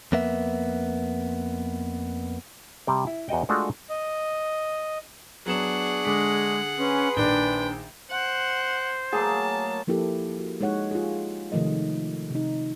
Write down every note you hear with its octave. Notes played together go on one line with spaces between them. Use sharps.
F2 A#3 B3 E5
C3 G3 G5
E4
E2 F#4 D#5 G5
G#3 A3 D4 F4 F#4
D#5
F#3 B3 D4 G#4 F#5 C#6 E7
D3 G#3 D6 B6
C#4 B4 G#5 C6
A#1 D#3 D4 G5 G7
C5 F#5
F#3 A3 A#3 G#4 A5
F3 A#3 E4 G4 A4
F#4
G#3 D#4 C#5 F#5
F4 G4 G#4
C3 D#3 F3 A3 D#5
C3 D#4